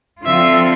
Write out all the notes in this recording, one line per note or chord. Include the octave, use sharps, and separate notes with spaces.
D3 F3 C4 F4 A4 E5